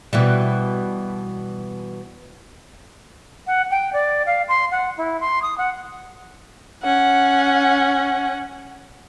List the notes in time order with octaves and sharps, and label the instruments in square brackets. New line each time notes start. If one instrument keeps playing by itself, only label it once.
[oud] B2 E3 G3
[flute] F#5
G5
D5
F5
C6
F#5
E4
C6
D#6
F#5
[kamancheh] C#4 F#5